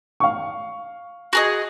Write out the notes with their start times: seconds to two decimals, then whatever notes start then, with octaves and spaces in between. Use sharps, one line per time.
0.20 F5 C#6
1.33 F#4 G#4 D#5